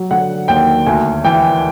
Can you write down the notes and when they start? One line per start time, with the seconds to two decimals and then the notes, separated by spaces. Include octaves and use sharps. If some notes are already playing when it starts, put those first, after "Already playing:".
Already playing: F#3
0.11 D3 F#5
0.48 D#2 G5
0.86 D2 G#5
1.24 E3 G5